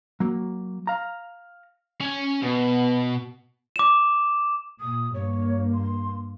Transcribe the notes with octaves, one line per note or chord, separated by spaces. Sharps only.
F#3 A#3
F5 A#5
C#4 G#5
B2 B3
D6 E7
A#2 D#6
G2 A#3 C#5
C6